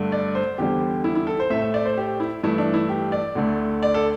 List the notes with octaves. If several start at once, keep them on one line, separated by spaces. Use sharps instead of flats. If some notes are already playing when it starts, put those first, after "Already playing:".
Already playing: G2 D3 A3
D5
C5
E2 D3 G3 G4
E4
E4
A4
C5
A2 A3 E5
E5
D5
C5
G4
E4
G2 E3 A3 E4
D4
E4
G4
D5
D2 D3 A3
D5
A4